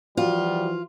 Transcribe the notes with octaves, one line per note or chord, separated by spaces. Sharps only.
E3 F3 G3 F4 F#4